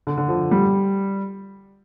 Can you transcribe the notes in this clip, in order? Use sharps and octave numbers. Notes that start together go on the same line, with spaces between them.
D3
D3
F3
G3